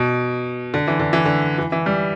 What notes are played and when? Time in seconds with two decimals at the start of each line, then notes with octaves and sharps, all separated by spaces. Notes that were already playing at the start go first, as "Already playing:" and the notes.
Already playing: B2
0.74 D3
0.87 E3
0.99 D3
1.13 E3
1.25 D3
1.58 E3
1.72 E3
1.86 G3